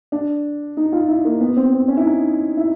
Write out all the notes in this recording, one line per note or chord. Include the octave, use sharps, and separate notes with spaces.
D4
D#4
F4
E4
A#3
B3
C4
C4
C#4
E4
D#4
E4